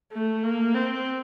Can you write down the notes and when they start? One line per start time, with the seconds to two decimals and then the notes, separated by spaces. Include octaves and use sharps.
0.12 A3
0.43 A#3
0.75 C4